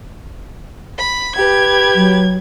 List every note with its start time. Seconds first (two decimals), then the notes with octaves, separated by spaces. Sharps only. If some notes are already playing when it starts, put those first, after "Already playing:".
0.98 B5
1.36 G4 B4 G#6
1.95 F#3